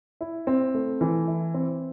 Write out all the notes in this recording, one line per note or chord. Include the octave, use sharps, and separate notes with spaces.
E4
C4
A3
E3
E4
C4